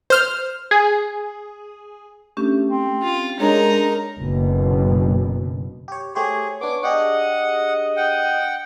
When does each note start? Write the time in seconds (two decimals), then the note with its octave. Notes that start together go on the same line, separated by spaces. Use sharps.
0.10 C5 F6
0.71 G#4
2.37 A3 C#4 D4 G4
2.67 C4
3.03 F4 C6
3.40 G#3 D4 D#4 G#4 A#4 C#5
4.19 F#1 B2 D3
5.88 G4 C#5
6.15 A3 G4 G#4 C5 C#5
6.61 B3 D4 D6
6.83 D4 G4 G#4 D#5 F#5
7.97 F#5 G5